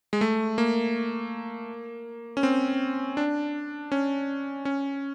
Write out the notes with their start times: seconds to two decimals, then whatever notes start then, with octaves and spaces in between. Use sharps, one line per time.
0.13 G#3
0.21 A3
0.58 A#3
2.37 C#4
2.43 C4
3.17 D4
3.92 C#4
4.65 C#4